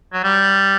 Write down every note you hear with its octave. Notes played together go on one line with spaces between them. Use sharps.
F#3
G3